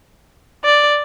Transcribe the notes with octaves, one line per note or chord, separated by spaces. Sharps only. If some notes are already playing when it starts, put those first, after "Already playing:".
D5